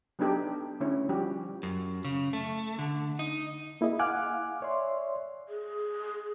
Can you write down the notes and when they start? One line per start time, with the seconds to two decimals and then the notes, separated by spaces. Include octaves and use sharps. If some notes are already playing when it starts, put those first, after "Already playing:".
0.19 F#3 B3 D4 D#4 G4 A4
0.80 D3 A3 C#4 E4 C#5
1.09 F3 G3 F#4 G4
1.63 F#2
2.05 C#3
2.33 A3
2.79 D3
3.19 D#4
3.81 A#3 E4 G#4 D#5
3.99 F5 F#5 G#5 D6 F6 F#6
4.62 C#5 D5 E5 C6
5.49 G#4